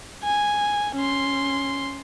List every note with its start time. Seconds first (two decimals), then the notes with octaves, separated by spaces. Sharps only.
0.23 G#5
0.95 C#4 C6